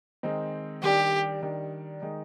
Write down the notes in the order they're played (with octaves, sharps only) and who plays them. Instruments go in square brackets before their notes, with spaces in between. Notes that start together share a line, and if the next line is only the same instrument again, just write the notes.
[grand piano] D#3 G#3 C4 D#4
[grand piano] D#3 G3 D4 [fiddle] G4
[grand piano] D#3 G3 D4
D#3 G#3 D#4